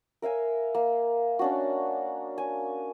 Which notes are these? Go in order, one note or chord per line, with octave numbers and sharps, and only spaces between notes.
A#4 E5 F5 G#5
A#3
C#4 D4 F#4
G#5